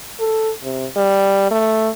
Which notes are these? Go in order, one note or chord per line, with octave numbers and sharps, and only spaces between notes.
A4
C3
G3
A3